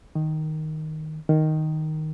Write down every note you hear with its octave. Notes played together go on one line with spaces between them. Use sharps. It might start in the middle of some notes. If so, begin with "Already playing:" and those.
D#3
D#3